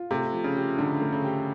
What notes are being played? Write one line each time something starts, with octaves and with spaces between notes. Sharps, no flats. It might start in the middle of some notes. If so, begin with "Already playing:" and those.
Already playing: F4
C3 A3
F3
C#3
G4
D3 A3
A3
C#3
G4